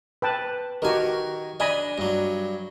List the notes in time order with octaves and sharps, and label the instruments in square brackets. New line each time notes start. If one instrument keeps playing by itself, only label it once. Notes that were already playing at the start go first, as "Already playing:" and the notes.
[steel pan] B4 G5 A5
[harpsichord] D#3 G#5 [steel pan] F#4 G4 A#4
[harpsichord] D4 [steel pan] D#5 G#5 B5
[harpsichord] G2 F#3